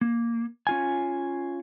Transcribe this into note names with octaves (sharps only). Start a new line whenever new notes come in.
A#3
C#4 F4 G#5